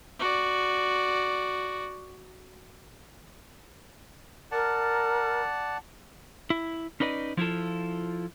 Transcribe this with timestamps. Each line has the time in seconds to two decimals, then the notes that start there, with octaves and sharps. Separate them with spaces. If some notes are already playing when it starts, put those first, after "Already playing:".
0.19 F#4 D5
4.52 A#4 D5 F#5 A5
6.50 E4
7.00 C#4 D#4 B4 D5 D#5
7.37 F3 E4 F4 A4